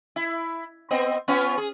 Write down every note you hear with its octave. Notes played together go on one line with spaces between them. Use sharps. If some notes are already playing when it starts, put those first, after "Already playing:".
E4
B3 C4 D#5
B3 C#4 F4
G#4